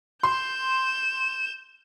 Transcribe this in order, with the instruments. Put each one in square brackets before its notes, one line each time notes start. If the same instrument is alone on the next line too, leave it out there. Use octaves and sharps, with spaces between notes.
[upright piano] C6 [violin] G6 E7